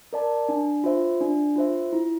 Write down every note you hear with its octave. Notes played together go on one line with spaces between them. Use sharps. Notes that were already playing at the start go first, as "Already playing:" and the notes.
A#4 D5 A5
D4
F4 C5 E5
D4
F4 C5 E5
E4